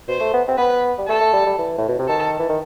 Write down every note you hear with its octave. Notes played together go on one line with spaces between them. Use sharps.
B2 C5
A3
B3
C4
B3 B4
G3
A3 A4
A3
G3
G3
E3
A2
B2
C3
D#3 A4
E3
D#3